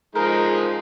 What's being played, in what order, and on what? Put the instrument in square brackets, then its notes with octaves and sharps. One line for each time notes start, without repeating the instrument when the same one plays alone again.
[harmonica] F3 G#3 D#4 [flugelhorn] G#4 [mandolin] A#4